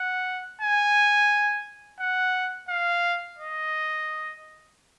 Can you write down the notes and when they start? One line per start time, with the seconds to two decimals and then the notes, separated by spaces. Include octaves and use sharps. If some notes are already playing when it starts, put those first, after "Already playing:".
Already playing: F#5
0.62 G#5
2.00 F#5
2.69 F5
3.39 D#5